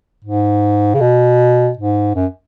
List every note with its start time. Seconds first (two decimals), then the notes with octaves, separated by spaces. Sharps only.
0.24 G#2
0.94 C#3
1.01 B2
1.77 G#2
2.15 F#2